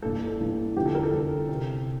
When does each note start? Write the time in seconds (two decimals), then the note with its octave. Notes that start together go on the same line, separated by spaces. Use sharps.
0.02 G2 E3 A#3 A4
0.27 A4
0.39 G2 E3 A#3
0.76 E2 D3 F3 G4
0.86 A4
0.95 A#4
1.03 A4
1.13 E2 D3 F3
1.49 C3